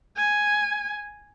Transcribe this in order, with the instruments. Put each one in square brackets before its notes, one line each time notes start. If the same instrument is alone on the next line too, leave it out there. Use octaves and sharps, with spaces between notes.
[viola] G#5